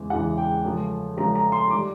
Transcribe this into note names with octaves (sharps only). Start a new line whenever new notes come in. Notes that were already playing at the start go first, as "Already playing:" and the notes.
Already playing: E2 C#3 E3 G#3
E2 C#3 E3 G#3 F#5
G5
C#2 C#3 F3 A3 C#4
C#2 C#3 F3 A3 C#4 A#5
A#5
C6
D#3 G3 D6